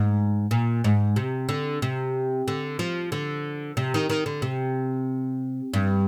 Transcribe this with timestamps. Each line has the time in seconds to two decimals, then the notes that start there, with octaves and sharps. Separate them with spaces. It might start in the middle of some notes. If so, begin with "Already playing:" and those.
Already playing: G#2
0.51 A#2
0.84 G#2
1.16 C3
1.49 D3
1.82 C3
2.48 D3
2.79 F3
3.12 D3
3.77 C3
3.94 D#3
4.10 D#3
4.26 D3
4.42 C3
5.74 G2